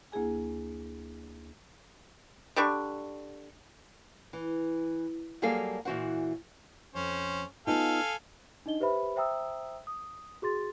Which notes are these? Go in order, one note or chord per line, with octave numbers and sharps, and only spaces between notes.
D2 A#3 E4 G#4 G#5
D3 G3 D4 C#6
E3
F#3 G3 A#3 G#4 A4 F5
A#2 E3 F#4 C5 F#5
F2 C#4 C5
B3 D#4 F4 A4 F5 G#5
D4 D#4 D#5 G7
G4 B4 C5 E5 B5
C5 E5 G5 A#5 D#6 E6
D#6
F#4 G#4 C6 A6